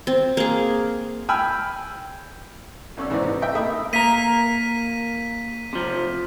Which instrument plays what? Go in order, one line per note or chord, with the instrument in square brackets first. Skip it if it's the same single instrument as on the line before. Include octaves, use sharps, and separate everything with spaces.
[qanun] C4
A#3 G#4
[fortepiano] G5 G#5 B5 E6 F6
B1 C#4 D5 E6
G#2 E3 C4 C#4 D#4 D5
C3
D#5 E5 G5
A3 A#3 E5 B5 D#6 E6
[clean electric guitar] A#3 A#4 [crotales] B6 D#7
[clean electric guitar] C3 F3